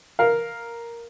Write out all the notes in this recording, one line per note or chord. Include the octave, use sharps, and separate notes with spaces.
A#4 F5